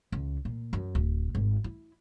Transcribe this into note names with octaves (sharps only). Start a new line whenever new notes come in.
C#2
A#2
F#2
D1
G#1
E4